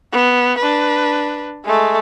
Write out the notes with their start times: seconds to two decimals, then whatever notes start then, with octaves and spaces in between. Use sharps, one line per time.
0.13 B3
0.59 D4 B4
1.65 G#3 A3